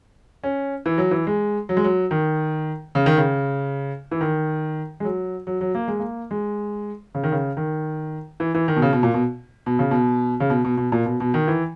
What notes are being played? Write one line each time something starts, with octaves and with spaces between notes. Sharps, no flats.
C#4
E3
F#3
E3
G#3
F#3
G#3
F#3
D#3
C#3
D#3
C#3
E3
D#3
G#3
F#3
F#3
F#3
A#3
G#3
A#3
G#3
C#3
D#3
C#3
D#3
E3
E3
D#3
B2
C#3
B2
A#2
B2
B2
C#3
B2
C#3
B2
B2
B2
A#2
B2
B2
D#3
E3